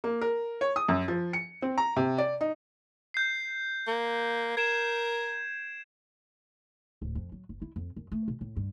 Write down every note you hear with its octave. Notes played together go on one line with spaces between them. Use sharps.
A#3
A#4
C#5
D#6
F#2
F3
C#7
C4
A#5
C3
D5
D#4
G6 C7
A#3
A#4 G#6 D7 E7
D1
F2
F#3
F#1
E4
F2
F#2
A3
B2
A2
G2